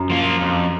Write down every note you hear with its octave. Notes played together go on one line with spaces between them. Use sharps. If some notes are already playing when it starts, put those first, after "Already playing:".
Already playing: F#2
F3 A#3 F4
F2